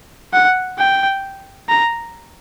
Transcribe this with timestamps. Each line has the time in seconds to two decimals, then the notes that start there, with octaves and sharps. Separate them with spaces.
0.33 F#5
0.79 G5
1.69 A#5